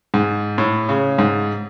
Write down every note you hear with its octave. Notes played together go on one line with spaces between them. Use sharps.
G#2
A2
C#3
G#2